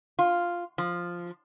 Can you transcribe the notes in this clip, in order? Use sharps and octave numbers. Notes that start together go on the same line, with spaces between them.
F4
F3